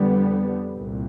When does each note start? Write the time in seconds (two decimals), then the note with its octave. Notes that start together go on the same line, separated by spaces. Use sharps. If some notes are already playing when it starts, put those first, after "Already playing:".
Already playing: F2 D3 G3 B3
0.76 C2 A#2